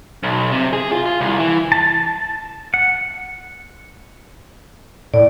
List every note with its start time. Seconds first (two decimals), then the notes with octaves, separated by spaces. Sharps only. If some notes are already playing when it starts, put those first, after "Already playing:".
0.23 B1
0.52 C3
0.73 G#4
0.92 F4
1.06 F4
1.21 C2
1.38 E3
1.72 A5
2.74 F#5
5.14 A2 D5